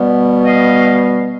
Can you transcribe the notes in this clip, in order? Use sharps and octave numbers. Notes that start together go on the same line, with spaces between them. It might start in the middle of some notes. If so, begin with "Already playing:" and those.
Already playing: B2 G3 B3
D#5 F5